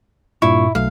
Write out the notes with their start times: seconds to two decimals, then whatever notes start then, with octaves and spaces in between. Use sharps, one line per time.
0.42 G2 A#2 E4 C#6
0.75 B1 A3 F5